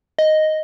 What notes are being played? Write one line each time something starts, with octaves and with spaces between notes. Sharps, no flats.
D#5